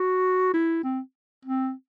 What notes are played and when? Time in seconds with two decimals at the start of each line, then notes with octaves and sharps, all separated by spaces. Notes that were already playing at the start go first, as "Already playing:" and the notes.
Already playing: F#4
0.54 E4
0.84 C4
1.45 C4